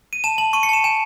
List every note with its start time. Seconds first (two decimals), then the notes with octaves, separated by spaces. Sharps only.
0.13 D#7
0.24 A5 E7
0.38 A5 F#7
0.53 C#6 D#7
0.63 C#7
0.69 A5 E7
0.84 G#5 E7